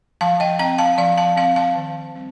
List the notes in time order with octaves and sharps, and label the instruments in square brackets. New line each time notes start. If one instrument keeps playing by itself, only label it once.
[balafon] F3 F5 A5
D#5 G5
C4 G5 A#5
F5 A5
F3 D5 F5
F5 A5
C4 F5 A5
F5 A5
D#3
G3 C4